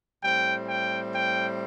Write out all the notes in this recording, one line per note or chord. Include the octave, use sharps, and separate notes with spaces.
A2 G3 C4 G5
G5
G5